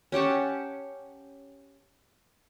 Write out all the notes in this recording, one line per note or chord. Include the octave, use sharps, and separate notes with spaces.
C#4 G4 F#5 A5